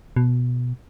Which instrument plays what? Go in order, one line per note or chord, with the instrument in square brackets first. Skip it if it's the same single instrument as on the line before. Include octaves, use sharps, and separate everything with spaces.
[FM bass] B2